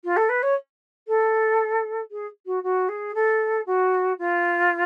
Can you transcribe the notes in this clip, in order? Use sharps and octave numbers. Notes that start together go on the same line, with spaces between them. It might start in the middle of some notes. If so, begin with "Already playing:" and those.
F4
A4
B4
C#5
A4
G#4
F#4
F#4
G#4
A4
F#4
F4